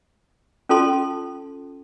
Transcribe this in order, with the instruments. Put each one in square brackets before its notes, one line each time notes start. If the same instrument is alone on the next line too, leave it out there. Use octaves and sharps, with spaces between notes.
[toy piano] C#4 F4 A4 A5 C6